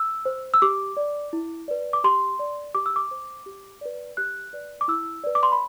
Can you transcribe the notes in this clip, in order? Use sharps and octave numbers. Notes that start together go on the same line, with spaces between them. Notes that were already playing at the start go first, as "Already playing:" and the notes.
Already playing: E6
C5
E6
G4 D6
D5
E4
B4 D5
D6
G4 C6
D5
G4 D6
E6
D6
C5
G4
B4 D5
G4 F#6
B4 D5
D6
E4 E6
B4 D5
D6
C6
B5